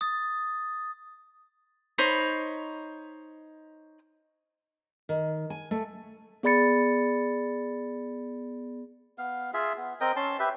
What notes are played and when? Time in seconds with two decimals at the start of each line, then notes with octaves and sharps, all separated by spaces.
0.01 D#6 A6
1.98 D#4 C5 C#5 B5
5.09 D#3
5.50 G#5
5.71 A3
6.43 B3 G#4 D5 B5 A6 C#7
9.18 B3 F5
9.54 F4 G#4 E5
9.77 B3
10.00 C4 A#4 D#5 G5
10.16 C#4 A5 C6
10.40 G4 B4 E5